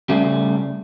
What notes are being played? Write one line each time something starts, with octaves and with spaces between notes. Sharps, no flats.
C#3 G3 A3